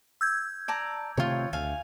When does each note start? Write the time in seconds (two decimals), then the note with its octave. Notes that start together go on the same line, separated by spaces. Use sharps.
0.21 E6 G6 G#6
0.68 D5 A5 A#5
1.17 C3 D#3 A3 F4 C#5
1.53 D2 F5 G#5